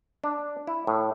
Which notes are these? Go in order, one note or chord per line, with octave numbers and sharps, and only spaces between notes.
D4
E4
A2